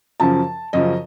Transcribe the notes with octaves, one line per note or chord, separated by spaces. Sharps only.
F#2 C#3 F3 A5
F#2 C#3 F3 D#5